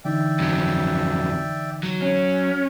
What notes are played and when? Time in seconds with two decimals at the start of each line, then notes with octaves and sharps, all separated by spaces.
0.05 D3 E3 D#4 D5 E5 G5
0.40 F2 F#3
1.83 F#3
2.02 C#4